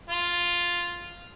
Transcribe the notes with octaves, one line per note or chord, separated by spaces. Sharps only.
F4